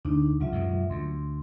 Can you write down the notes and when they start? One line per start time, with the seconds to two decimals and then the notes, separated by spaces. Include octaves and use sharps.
0.05 D2 D4 D#4
0.40 C#2 F#3 F4 E5
0.52 F#2 B2 G#3
0.90 D2 C6